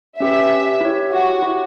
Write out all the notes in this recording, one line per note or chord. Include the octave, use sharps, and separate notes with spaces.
C#4 G4 B4 E5
E4 G4 C#5
F#4
E4 G4 C#5